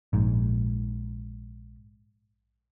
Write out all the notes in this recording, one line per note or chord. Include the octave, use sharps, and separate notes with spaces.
A#1 G#2